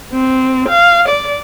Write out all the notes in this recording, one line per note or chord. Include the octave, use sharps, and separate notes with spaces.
C4
F5
D5